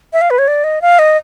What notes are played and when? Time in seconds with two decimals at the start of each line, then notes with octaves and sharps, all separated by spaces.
0.13 E5
0.21 F5
0.30 B4
0.39 C#5
0.48 D5
0.64 D#5
0.82 F5
0.99 D#5